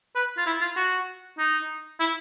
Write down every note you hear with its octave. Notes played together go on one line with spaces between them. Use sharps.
B4
F4
E4
F4
F#4
D#4
E4